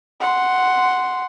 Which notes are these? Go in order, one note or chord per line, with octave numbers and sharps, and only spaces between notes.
F#5 C6